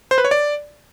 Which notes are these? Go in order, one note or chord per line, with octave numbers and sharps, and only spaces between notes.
C5
B4
C#5
D5